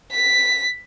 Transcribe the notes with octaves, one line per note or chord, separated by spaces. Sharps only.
B6